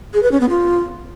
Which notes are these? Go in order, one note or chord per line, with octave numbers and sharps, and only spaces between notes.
G#4
B4
C#4
B3
F4